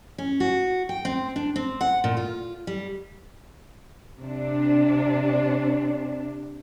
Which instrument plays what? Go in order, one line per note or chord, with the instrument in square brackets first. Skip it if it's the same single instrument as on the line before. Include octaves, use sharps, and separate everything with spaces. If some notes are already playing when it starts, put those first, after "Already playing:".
[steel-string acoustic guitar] C#4
F#4
G5
C4
D4
C4
F#5
A#2
F4
G3
[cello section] C3 D4